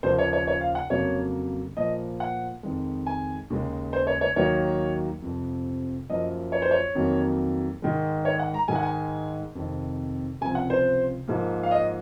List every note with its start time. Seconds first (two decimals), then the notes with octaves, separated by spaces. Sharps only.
0.03 D#2 C#3 F3 A#3 C5
0.18 C#5
0.33 C#5
0.47 C#5
0.61 F5
0.75 F#5
0.90 F2 C#3 F#3 A#3 C#5
1.77 A#2 F3 A#3 D#5
2.20 F#5
2.63 F2 D#3 G#3
3.07 G#5
3.50 D#2 C#3 G#3
3.93 C5
4.07 C#5
4.21 C#5
4.36 D#2 D#3 F#3 A#3 C#5
5.22 F2 C3 F3
6.09 F#2 F3 A#3 D#5
6.52 C#5
6.62 C5
6.71 C#5
6.95 F2 D#3 F#3 A#3
7.82 G#2 D#3 G#3
8.25 C#5
8.39 F#5
8.54 A#5
8.68 G#2 D#3 G#3 G#5
8.75 F#5
8.83 G#5
9.55 F2 C3 D#3
10.41 C#2 C3 F3 G#5
10.55 F#5
10.70 C5
11.28 G#2 F3 A#3
11.63 F5
11.71 D#5